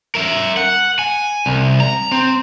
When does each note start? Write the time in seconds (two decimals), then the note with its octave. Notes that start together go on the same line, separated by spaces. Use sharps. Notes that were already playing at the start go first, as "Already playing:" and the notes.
0.15 A#4 E5
0.57 F#5
0.99 G#5
1.46 C2
1.80 A#5
2.11 C4